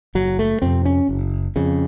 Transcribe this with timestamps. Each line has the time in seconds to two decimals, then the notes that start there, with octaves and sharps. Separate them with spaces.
0.15 F#1 F#3
0.39 A3
0.62 F2 C3 C4
0.85 C#4
1.09 F#1
1.56 F2 C#3